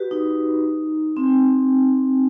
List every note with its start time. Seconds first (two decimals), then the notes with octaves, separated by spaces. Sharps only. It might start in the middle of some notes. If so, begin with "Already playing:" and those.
Already playing: F#4 G4 B4
0.11 D#4
1.17 C4